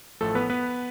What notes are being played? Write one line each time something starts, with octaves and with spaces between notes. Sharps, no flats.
A1 A2 F3 A3 A4
B3 B4
B3 B4